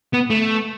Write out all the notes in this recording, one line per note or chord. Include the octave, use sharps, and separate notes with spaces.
B3
A3